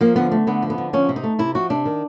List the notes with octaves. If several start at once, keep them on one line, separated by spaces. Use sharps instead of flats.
F3 A#3
D3 B3
A3
D3 B3
F3
B3
D3
F3 C#4
C3
D#4
A3
C3 E4
F3 F#4
C3 D4
D#3